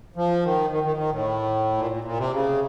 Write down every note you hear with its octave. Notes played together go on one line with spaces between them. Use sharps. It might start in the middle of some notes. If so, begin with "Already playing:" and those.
F3
D#3
D#3
D#3
D#3
A2
A#2
A#2
A#2
C3
C#3